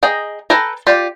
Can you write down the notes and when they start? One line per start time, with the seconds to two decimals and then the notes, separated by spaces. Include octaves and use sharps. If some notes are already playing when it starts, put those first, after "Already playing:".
0.03 G#4 D#5 G5 A#5
0.50 A4 B4 G5 G#5 A#5
0.87 F4 G4 D5